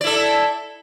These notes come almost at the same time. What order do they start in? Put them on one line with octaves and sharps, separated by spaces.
D5 E4 A4